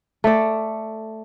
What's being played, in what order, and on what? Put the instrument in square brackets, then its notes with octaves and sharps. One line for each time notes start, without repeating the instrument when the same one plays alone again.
[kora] A3 D5